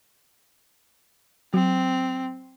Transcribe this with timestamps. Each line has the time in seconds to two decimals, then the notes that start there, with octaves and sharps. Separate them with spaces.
1.54 F#3 C4